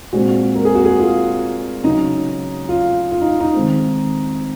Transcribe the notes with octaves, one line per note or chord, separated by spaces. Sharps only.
A#2 G#3 C4 F#4
A#4
G#4
F#4
G#4
F4
C#3 F#3 C#4 D#4
F4
F4
D#4
D#4
D#3 G#3 C4